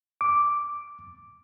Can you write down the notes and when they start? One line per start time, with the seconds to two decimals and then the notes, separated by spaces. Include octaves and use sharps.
0.21 D6